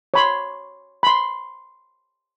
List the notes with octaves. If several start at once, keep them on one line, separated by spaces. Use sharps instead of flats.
C#5 B5 C6
B5 C6